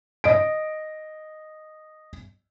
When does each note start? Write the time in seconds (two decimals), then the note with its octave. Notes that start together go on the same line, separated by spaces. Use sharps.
0.24 D#5 D7